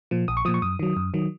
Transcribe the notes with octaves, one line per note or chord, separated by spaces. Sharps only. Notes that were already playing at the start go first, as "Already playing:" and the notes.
A#2 F3
A#1 D#6
C#6
A#2 F3 D#6
C#6
F#2 D#6
D#3 F#3
F#2
D#3 F#3